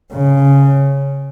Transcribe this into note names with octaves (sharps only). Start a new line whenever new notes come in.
C#3